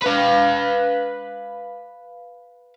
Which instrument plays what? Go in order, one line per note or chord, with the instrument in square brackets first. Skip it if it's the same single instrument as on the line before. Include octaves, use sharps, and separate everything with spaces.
[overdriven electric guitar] B4 F5